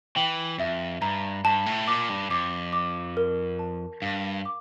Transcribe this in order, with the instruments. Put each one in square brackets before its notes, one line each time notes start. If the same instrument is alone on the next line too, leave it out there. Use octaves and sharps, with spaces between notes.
[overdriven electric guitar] E3 [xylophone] G5
[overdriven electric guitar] F2 [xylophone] E5
[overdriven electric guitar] G2 [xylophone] A#5
[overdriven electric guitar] G2 [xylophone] A5
[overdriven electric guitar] A2
[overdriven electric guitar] A#2 [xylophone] D6
[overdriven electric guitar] G2
[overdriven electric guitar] F2 [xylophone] D6
[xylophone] D6
A#4
A5
[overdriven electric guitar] G2 [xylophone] F5
[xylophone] D6